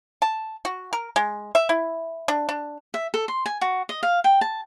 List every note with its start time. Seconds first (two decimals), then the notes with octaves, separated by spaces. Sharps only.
0.22 A5
0.65 F#4
0.93 A#4
1.16 G#3
1.55 E5
1.69 E4
2.28 D4
2.49 D4
2.94 E5
3.14 A4
3.28 C6
3.46 G#5
3.61 F#4
3.89 D#5
4.03 F5
4.24 G5
4.41 A5